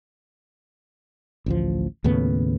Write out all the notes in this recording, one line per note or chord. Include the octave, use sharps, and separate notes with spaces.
A1 D2 F3
D#2 A2 C#3 B3